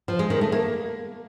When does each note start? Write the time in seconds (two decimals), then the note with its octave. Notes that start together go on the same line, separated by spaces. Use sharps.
0.08 F3
0.19 G#3
0.30 D#3
0.41 A3
0.52 A#3